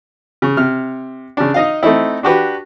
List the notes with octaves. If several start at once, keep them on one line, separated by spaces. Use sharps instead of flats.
C#3
C3 F6
C#3 D4
D#4 D#5 F5
A3 C4 D#4 E4
D4 F#4 G4 B4